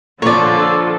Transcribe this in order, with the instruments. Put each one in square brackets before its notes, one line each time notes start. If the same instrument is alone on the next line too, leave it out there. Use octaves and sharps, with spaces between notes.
[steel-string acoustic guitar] A#2 F3 [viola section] D3 F4 A4 [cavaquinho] C#5 D5